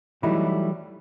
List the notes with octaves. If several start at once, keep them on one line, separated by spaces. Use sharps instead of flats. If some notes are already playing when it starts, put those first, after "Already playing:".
E3 F#3 G3 A3 D#4 E4